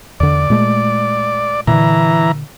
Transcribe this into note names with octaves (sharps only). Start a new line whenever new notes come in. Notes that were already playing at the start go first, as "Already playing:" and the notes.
E2 D3 D5
A#2 G#3 A3
A#2 D3 E3 A#5